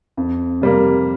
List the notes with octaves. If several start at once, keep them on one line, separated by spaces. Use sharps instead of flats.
F2
C3 G3 A#3